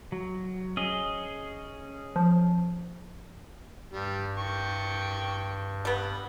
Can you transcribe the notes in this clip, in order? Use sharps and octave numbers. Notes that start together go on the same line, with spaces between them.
F#3
C#4 G#4 D#5
F3
G2 G3
G5 C#6
G3 B3